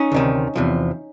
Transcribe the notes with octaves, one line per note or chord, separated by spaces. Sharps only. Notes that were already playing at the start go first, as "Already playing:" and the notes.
Already playing: C#4 D#4
D2 C3 D#3
E2 C3 F3